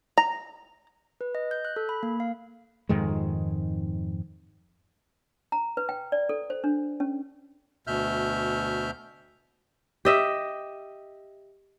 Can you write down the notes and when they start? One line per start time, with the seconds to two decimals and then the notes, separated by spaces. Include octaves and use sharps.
0.18 A#5
1.21 B4
1.35 D#5
1.51 G6
1.65 F#6
1.76 A4
1.89 B5
2.03 A#3
2.20 F5
2.89 F2 G#2 D#3 G#3
5.52 A#5
5.77 B4
5.89 G5
6.12 D5
6.29 A4
6.50 C5
6.64 D4
7.00 C#4
7.87 D2 B2 E5 F6 G6
10.05 G4 D#5 E5